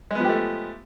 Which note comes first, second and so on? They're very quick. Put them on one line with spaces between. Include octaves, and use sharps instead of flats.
G#3 B3 F3 G4 A3